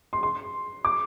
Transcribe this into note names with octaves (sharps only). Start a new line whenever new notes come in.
C6
C6
D6